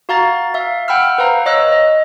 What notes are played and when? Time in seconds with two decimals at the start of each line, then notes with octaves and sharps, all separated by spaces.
0.09 F#4 F5 A#5 A6
0.54 E5 F5
0.88 F#5 G5 B5 E6 F6
1.18 B4 C5 F5 A#5
1.46 C#5 D#5 E6 F#6
1.72 D#5